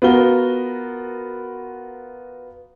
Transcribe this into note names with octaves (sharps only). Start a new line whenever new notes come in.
B3 F4 F#4 A#4 G7